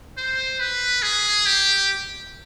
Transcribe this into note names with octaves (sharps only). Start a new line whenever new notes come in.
C5
B4
G#4
G4